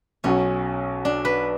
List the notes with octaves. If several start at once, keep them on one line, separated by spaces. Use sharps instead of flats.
B1 B2 F#3 C#4
D4
B4